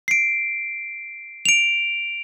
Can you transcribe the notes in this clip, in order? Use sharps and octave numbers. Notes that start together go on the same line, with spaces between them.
C7 D7
D7 F7